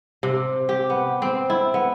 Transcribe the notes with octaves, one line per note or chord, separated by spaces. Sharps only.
C3
G4
B3
C4
E4
B3